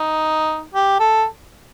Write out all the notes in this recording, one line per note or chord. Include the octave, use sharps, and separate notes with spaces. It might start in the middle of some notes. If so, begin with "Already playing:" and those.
Already playing: D#4
G4
A4